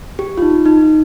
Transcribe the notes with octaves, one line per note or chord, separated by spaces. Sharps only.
G4
F4
D#4
D#4